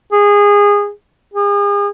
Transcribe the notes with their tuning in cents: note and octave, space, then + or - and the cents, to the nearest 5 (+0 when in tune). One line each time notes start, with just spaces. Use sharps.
G#4 -20
G#4 -40